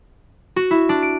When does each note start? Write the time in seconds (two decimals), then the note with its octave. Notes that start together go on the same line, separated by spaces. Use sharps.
0.56 F#4
0.71 E4
0.89 D4
1.02 D7